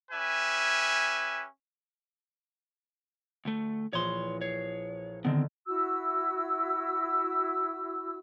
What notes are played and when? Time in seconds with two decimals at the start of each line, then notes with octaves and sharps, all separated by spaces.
0.12 C#4 G4 B4 E5 G#5
3.45 D2 A3
3.93 A#1 E3 C#5 C6 D#6
4.41 C#5 C7
5.25 D3 D#3 A3 B3 C4
5.66 E4 F#4 E6